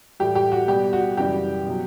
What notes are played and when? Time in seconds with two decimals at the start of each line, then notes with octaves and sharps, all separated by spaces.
0.20 A2 E3 G3 G4
0.35 G4
0.52 F#4
0.68 B2 G3 G4
0.93 F#4
1.17 F#2 C#3 E3 G3 G4
1.66 B2 F#3